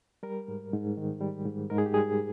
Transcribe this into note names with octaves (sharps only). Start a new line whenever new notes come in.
G3 A#4
G#2
G#2
D#3
G3
G#2
G#2 A#4
G#4
G4
G3 G#4